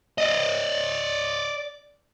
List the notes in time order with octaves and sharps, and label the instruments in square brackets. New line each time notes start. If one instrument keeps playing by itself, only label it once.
[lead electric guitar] D5 D#5